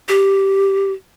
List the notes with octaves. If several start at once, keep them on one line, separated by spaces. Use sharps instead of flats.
G4